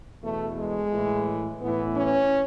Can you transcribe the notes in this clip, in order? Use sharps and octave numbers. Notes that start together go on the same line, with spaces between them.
E2 B2 A3
G#3
A2 E3
A2 E3 B3
C#4